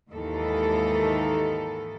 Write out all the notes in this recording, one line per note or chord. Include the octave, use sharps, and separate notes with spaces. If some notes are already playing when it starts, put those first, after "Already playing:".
D#2 G#2 D#3 E3 A4